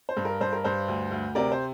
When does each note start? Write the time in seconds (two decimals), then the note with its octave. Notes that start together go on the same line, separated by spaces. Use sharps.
0.09 C5
0.17 G2
0.25 A#4
0.40 G2 C5
0.53 A#4
0.64 G2 C5
0.88 D2
1.11 D2
1.35 C3 A#4 D5
1.52 C5